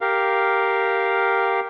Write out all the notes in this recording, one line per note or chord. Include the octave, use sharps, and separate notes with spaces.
G4 A#4 F5